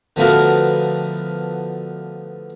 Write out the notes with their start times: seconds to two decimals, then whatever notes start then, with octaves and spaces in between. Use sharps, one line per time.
0.16 D3 F3 A3 B3 F#4 A#4